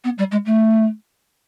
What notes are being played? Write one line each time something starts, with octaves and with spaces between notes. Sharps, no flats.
B3
G3
G#3
A3